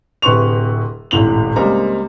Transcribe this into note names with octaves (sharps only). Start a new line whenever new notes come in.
D1 C3 B4 C6 C#6 F7
D#1 G#1 A2 F7 F#7
C#2 G3 G#3 A#3 C4 A#5